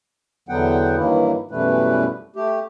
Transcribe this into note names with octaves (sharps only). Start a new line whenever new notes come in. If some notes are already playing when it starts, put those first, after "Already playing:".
E2 D3 F#3 B3 F#5 G5
G2 D#3 E3 F#3 A#3 E4
F#2 B2 E3 G3 A3 B4
A3 G4